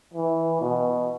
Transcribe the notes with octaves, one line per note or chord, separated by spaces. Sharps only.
E3
B2